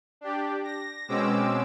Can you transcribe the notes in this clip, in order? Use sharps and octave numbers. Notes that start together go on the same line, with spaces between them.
D4 G4
A#6
B2 G#3 C4 C#4 D6 E6